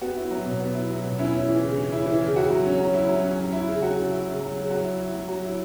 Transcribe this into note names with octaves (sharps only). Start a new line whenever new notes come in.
B3 F#4
E4
F#3
B2
B3
E4
F#3
B2
C#4 E4
E4
E3
C#3
C#4
E4
E3
C#3
E4 F#4
F#3
C#4
F#3
E4
F#3
C#4
F#3
E4
C#3
F#3 F#4
C#3
E4
C#3
F#3
C#3
F#3 F#4
E4
E4
F#3
F#3
E4